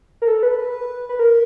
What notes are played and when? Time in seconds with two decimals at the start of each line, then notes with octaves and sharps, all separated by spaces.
0.22 A#4
0.28 A4
0.43 B4
0.58 B4
1.09 B4
1.19 A#4